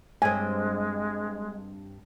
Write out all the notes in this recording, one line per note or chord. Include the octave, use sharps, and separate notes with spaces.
G2 G#3 C4 G#5